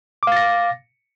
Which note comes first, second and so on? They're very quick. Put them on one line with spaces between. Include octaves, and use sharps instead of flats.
D6 F5 A6 A#6